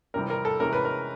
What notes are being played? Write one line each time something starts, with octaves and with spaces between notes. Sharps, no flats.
F2 C3 E3 G3 C4 A#4
A#4
A4
C3 E3 G#3 C#4 A#4
B4
A#4